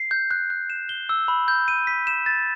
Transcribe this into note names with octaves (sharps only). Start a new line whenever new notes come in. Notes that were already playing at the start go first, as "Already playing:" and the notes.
Already playing: C7
G6
F#6
F#6
E7
G7
E6
B5
G6
D#7
B6
E7
A6